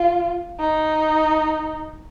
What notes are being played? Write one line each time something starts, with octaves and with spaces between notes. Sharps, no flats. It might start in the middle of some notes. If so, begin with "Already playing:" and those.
Already playing: F4
D#4